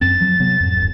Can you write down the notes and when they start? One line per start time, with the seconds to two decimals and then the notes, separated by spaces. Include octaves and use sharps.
0.01 F#2 C4 A6
0.21 F3 F#3
0.40 C3 F#3 B3
0.60 F2 G#2
0.77 D1 B1 F#2